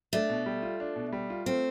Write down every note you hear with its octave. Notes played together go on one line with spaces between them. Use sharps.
A3 D4
B2
G3
F4
D4
B2
G3
F4
A3 C4